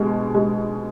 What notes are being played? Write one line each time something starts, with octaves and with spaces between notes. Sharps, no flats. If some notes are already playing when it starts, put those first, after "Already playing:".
Already playing: B2 G#3
G#3